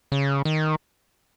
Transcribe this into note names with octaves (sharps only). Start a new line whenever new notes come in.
C#3
D#3